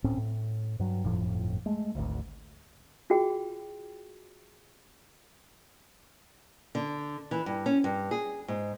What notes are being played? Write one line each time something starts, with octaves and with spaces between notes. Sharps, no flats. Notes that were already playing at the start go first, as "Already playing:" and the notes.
D1 A2 C4 C#4
A2
G2 F#3
G1 F2 A2 F3
G#3 A3
G#1 D2
F4 F#4 G#4 G5
D3
E3
G2
C#4
G2
G#4
G#2